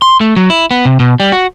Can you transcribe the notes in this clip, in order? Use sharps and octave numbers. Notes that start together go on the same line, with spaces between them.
C6
A3
F#3
E4
B3
C3
B2
G3
F#4